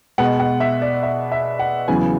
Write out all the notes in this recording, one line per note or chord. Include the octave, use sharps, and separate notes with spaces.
B2 G#3 B3 F#5
F#5
E5
D5
E5
E5
F#5
E2 C#3 F#3 B3 G#5